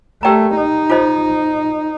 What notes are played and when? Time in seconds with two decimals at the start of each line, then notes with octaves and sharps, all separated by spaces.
0.23 A3 G4 A#4 D5 G5 A#5
0.57 D#4
0.90 F4 A4 C5 D#5